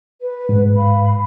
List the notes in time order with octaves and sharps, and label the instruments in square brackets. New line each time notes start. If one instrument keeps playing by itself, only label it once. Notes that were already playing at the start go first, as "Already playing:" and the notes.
[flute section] B4
[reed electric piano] G#2
[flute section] F5 B5